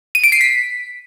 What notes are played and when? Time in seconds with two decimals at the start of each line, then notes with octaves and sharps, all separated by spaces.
0.15 D#7
0.24 D7
0.32 C7
0.41 B6